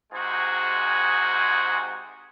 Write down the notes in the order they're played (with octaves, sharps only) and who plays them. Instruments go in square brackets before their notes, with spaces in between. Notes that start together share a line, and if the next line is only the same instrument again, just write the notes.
[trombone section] G#2 C3 G#3 F#4 G#4